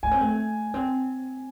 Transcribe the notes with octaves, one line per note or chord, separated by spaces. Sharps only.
A3 G#5
C4
A3
C4